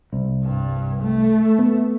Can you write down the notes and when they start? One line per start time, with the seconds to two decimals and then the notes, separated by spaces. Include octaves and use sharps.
0.13 C2
0.44 G2
1.02 A3
1.59 B3